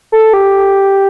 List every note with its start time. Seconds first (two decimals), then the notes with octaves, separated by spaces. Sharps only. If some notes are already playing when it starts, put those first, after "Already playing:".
0.12 A4
0.33 G4